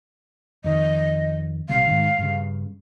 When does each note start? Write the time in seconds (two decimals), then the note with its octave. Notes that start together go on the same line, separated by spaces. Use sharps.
0.64 F2 D#3 D#5
1.69 A#1 C3 G3 F5
1.86 G#2 D#3
2.18 G2 C#3